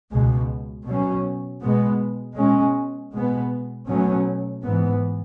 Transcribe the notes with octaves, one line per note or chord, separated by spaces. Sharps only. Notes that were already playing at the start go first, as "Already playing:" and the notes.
C#2 B2 G#3
B2 F#3 C#4
B2 G#3 B3
B2 G#3 C#4
B2 G#3 B3
B2 F#3 A3 C#4
G#2 E3 B3